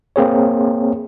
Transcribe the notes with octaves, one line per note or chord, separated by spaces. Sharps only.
A#3 C4 G#4 C#5